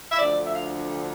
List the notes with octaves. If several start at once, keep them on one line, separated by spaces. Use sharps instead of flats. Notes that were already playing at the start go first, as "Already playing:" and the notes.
E5
D2 D3 F3 D5
E5
F5